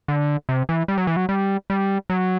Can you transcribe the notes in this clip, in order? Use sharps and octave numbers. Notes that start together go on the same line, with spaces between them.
D3
C3
E3
G3
F#3
E3
F#3
G3
G3
F#3